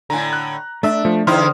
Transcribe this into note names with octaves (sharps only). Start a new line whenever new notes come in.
A2 D3 G#5 A#5
A#5 F#6
A3 D4 E5
F3 A3
E2 D3 D#4 E4 C5 C6 D#6 F6